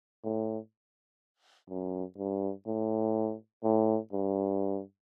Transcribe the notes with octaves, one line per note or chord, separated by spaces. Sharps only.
A2
F#2
G2
A2
A2
G2